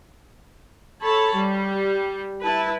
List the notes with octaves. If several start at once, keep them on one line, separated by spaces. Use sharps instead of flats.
A4 C#5 A5 B5
G3
E4 B4 A5